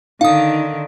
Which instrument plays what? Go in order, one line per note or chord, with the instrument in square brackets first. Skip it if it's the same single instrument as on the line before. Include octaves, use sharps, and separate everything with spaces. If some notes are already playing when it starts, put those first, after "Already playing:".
[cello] D3 D#3 [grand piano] D#4 [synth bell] F5 D#6